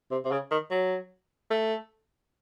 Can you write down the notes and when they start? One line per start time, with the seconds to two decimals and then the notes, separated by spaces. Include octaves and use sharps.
0.11 C3
0.25 C3
0.31 C#3
0.51 D#3
0.71 F#3
1.51 A3